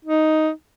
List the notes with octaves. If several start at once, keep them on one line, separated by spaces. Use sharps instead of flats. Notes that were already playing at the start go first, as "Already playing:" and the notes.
D#4